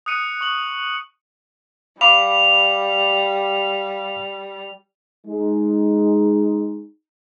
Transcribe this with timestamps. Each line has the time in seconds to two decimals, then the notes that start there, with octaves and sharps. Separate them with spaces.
0.06 D#6 F#6 C#7 D#7
0.41 C#6 F#7
2.01 G3 F5 B5 D6 F7
5.27 G#3 D#4